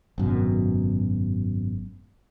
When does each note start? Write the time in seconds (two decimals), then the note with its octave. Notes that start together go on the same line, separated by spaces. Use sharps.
0.18 G#1 F#2 B2